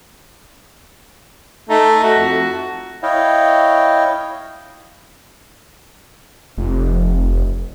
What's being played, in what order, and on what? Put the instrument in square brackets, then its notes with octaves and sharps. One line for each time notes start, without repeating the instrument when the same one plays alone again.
[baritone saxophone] A3 [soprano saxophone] D#4
[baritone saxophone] A3 [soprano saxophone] F#4
[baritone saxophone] F2
[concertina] E4 C#5 D#5 F5 G5
[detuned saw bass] F1